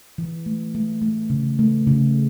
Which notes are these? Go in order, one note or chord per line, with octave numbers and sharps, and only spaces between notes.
E3
A3
A3
A3
C#3
A3
C#3